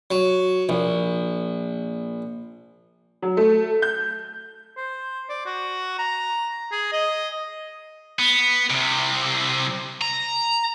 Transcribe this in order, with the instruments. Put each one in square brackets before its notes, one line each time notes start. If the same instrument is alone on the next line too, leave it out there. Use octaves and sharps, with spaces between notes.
[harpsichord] F#3
A#1
[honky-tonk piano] F#3
A3
G6
[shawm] C5
D5
F#4
A#5
G#4
D#5
[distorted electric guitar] B3
C2 C3
A#5